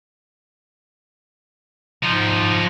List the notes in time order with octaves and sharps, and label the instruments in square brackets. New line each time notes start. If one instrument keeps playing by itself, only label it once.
[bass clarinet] G#2 [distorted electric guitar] F3 D#4